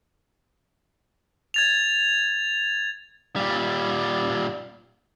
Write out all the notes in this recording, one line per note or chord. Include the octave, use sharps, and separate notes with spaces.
G#6 A6 F7
A#2 G3